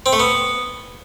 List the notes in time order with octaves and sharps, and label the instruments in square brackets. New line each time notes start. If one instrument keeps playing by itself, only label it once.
[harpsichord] C4
A3
B3